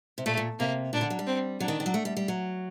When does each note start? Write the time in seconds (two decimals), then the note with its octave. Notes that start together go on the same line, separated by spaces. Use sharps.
0.18 C3
0.26 A#2 A3
0.37 A#2
0.59 C3 A#3
0.93 A#2 D4
1.01 D3
1.10 F#3
1.19 G3
1.27 C4
1.60 F#3 D4
1.68 D#3
1.80 D#3
1.86 F#3
1.94 A3
2.05 G3
2.17 G3
2.28 F#3